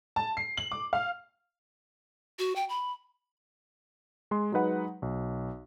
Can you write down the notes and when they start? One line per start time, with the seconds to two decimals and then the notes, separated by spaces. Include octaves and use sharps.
0.16 A5
0.37 C7
0.57 F#7
0.72 D6
0.93 F5
2.39 F#4
2.56 G5
2.69 B5
4.31 G#3 C6
4.52 F#3 G#3 D#4 B4 F#5
5.02 B1